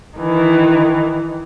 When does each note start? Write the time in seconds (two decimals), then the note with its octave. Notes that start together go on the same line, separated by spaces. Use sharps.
0.18 D#3 E3